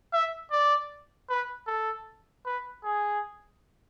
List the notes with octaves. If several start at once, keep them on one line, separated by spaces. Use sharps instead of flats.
E5
D5
B4
A4
B4
G#4